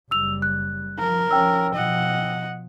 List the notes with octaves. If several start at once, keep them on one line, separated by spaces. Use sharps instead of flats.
F#1 G3 E6 F7
F#6
F3 A#4
F3 C#4 G5 E6
B2 F3 D#5 F#5